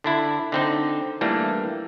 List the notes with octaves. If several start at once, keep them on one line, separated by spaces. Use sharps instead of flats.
D3 D4 E4
D3 C4 D#4
E3 G3 A3 A#3 D4